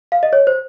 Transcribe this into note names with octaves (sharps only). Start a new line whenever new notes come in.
F5
D#5
C#5
C5